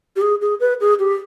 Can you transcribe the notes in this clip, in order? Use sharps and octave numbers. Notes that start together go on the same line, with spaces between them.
G4
G#4
G#4
B4
G#4
G4